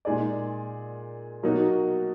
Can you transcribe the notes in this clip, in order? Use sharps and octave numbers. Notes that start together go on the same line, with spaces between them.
A#2 G#3 D#4 G#4 D5
B2 F#3 A#3 D#4 F#4